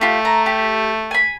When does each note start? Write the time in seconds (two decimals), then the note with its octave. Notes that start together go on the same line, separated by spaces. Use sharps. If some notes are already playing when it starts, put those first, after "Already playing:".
0.01 A3 F4 G4
0.25 A#5
0.46 G4
1.11 G#5 B5